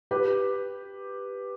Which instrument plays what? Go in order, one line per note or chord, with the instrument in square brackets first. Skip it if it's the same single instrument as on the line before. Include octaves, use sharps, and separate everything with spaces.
[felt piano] G4 B4